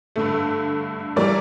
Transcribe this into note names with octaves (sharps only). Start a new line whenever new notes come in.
G2 D3 A3
E3 G3 A#4 D5